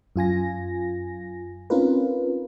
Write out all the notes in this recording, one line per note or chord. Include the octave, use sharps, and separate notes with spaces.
F#2 F4 G#5 A#6
C4 C#4 D#4 F4 A#4 B4